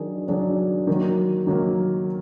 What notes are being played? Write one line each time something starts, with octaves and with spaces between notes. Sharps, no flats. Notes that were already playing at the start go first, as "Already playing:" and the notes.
Already playing: D#3 F#3 D4 G#4
D#3 F#3 D4 G#4
D#3 F#3 A#3
D#3 F#3 A#3